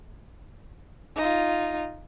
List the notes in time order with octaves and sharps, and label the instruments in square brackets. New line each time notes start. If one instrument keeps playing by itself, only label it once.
[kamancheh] D#4 F4